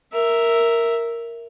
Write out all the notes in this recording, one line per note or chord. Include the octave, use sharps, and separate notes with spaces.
A#4 E5